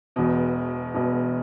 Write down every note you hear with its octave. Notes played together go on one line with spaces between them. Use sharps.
E1 E2 B2
E1 E2 B2